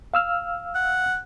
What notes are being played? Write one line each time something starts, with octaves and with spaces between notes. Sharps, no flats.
F5 E6 F6
F#5